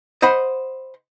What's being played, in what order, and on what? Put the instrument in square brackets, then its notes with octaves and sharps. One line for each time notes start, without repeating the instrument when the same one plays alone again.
[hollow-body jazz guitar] C5 D#5 F#5 B5